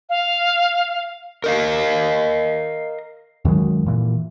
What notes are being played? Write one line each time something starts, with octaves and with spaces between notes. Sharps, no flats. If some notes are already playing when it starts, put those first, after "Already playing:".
F5
A#4 D#5 F5
F#2 D#3 F#3 G#3
A#2 E3